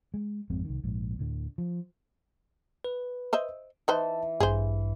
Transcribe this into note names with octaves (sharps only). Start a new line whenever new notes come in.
G#3
G#1 F2 G#3 C4
C2 D#3
A#1 G#2
D2 A2 D3
F3
B4
C5 D#5 E5
E3 D#4 B4 C5 E5 A5
A1 G2 G#4 C5